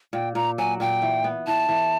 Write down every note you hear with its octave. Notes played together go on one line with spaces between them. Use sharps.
A#2 G5
A#2 A#5
F#3 G#5
A#2 G5
E3
B3
E3 A5
E3